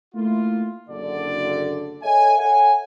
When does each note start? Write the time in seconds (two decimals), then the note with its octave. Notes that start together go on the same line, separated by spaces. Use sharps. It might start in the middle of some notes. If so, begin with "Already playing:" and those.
0.15 A3 A#3 E4 F4
0.89 F#1 D3 D5
2.03 A4 C#5 D#5 E5 G#5
2.38 A4 C#5 E5 F#5 G#5